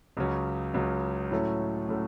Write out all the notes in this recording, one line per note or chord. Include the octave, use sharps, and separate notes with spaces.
C#2 C#3 F#3 C#4
C#2 C#3 F#3 C#4
A2 F#3 A3 C#4
A2 F#3 A3 C#4